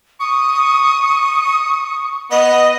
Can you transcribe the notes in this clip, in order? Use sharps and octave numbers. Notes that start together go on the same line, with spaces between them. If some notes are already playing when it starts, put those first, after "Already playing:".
C#6 D#6
B3 D#5